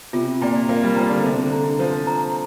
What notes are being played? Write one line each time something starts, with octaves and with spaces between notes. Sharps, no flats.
C3 F4
A#2 D5 G5 A#5
A#3 F4
G3
F3 D5 G5 A#5
D3
C3 C5
D3
A#5
F3 C5
A#5